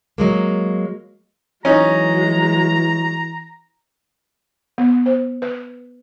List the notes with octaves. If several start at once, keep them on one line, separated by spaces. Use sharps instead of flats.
F#3 G#3 A#3
E3 F#3 G#3 C#4 D#4 A#5
B3
C5
B4